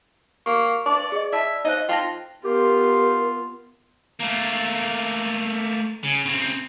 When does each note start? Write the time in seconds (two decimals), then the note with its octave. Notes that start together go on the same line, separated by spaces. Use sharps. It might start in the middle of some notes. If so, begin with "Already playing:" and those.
0.46 A#3 C#6
0.86 D5
1.12 G#4 D#5
1.33 D5 E5 A5
1.65 D#4 C5 D#5 F#6
1.89 F4 G5 A5 A#6
2.44 B3 F4 G4 A#4
4.20 A3 A#3
6.04 C#3
6.26 C#3 C4